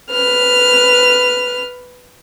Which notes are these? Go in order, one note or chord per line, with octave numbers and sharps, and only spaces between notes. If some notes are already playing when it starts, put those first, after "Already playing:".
B4 F6